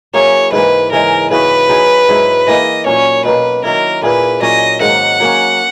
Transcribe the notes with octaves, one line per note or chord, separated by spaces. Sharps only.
F#3 A#3 E4 G#4 C#5
G#2 E3 A#3 B4
C#3 E3 G#3 A#4
C#3 E3 B3 F#4 B4
F#3 B3 D#4 G#4
G#2 F#3 B3 E4
E3 A#3 D#4 D#5
A#2 F#3 C#4 C#5
B2 F#3 A#3 B4
D#3 F#3 A#3 E4 A#4
A#2 A#3 E4 G#4 B4
A#2 F#3 C#4 D#5
G#2 D#3 F#3 A#3 F#5
F#3 A#3 C#4